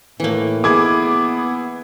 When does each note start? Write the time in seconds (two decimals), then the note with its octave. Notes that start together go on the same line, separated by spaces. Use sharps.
0.20 A2 E3 A#3
0.64 B3 E4 G#4 D6 G#6